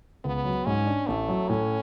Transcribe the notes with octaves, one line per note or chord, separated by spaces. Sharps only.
C#2 B3
F#3
G#2 C#4
D4
A1 A3
F#3
A2 C#4